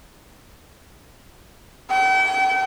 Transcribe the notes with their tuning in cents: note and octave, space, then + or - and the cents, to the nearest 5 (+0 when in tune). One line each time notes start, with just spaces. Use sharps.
G5 -40